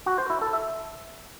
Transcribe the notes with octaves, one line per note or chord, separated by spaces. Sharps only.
F#4
C5
E4
A4
E5